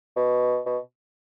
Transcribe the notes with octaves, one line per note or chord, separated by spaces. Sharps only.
B2
B2